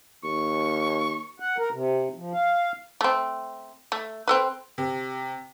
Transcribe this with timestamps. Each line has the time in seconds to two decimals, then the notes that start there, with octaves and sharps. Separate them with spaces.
0.24 D#2 C#6
1.40 F#5
1.58 A#4
1.72 C3
2.15 F3
2.33 F5
3.01 A3 C4
3.92 A3
4.28 C4 A4 B4
4.78 C3